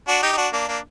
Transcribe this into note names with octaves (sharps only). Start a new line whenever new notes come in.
D4 F#4
D#4 G4
D#4
D4 F#4
A#3 D4
A#3 D4